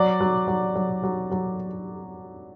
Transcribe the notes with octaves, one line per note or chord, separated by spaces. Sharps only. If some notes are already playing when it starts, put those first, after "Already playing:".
Already playing: F#3 D5
F#3
F#3
F#3
F#3
F#3